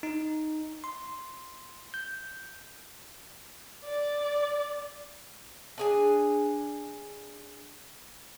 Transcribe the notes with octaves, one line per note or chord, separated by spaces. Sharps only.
D#4
C6
G6
D5
D4 G#4 G#5